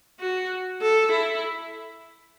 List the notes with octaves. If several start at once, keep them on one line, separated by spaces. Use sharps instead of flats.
F#4
A4
E4